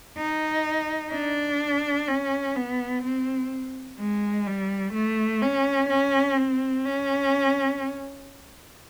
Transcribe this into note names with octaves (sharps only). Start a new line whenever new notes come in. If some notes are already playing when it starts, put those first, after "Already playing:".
D#4
D4
C#4
B3
C4
G#3
G3
A3
C#4
C#4
C4
C#4